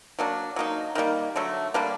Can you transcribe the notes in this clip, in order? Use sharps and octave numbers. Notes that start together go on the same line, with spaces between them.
F#3 A#3 D4
F#3 A#3 D#4
D#3 G3 A#3
D3 F#3 A3
D3 G3 A#3 D4